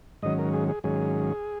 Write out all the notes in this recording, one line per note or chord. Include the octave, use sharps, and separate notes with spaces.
G#2 D#3 F#3 C#4 D#5
A#4
G#4
G#4
G#2 D#3 F#3 C#4 G#4